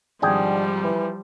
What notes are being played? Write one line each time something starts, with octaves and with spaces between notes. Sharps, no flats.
G#1 F3 G3 D4 G#4 G5
E3